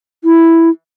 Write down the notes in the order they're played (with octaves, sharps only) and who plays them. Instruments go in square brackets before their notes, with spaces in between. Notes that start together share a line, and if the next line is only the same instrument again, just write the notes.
[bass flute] E4